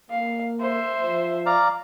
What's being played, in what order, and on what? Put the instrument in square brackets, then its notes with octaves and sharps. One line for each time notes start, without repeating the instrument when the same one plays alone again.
[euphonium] A#3 [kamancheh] F5
[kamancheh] C5 E5
[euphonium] F3
[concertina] D5 F5 A#5